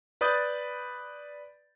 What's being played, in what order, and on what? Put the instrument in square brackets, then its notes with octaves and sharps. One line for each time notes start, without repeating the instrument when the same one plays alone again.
[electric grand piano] B4 D5 B5 D#6 G6 A6